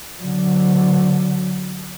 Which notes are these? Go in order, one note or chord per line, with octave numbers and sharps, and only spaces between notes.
D3 F#3